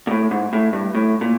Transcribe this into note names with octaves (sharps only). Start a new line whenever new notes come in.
A#2
A2
G#2
A2
G2
A2
A#2